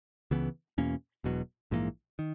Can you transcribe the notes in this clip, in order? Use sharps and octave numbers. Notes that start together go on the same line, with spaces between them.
C#2 C#3 E3 B3
E2 B2 A#3 C#4
E1 E2 B2 F#3
A#1 G#2 E3 A#3
D#3